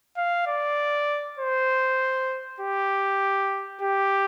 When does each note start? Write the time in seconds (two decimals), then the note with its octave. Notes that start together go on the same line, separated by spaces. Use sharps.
0.17 F5
0.47 D5
1.39 C5
2.60 G4
3.82 G4